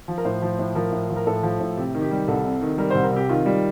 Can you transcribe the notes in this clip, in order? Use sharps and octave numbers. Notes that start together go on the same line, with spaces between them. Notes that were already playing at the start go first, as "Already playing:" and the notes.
F3
A#4
A2 C5
F3
A2
F3 A#4
A2
F3
A#4
A2 A4
F3
A2
C3 G4
D#3
G4
G3
C2 A4
C3
D#3
G3 A#4
C2 C5
A#4
C3 G4
D#3 F4
G3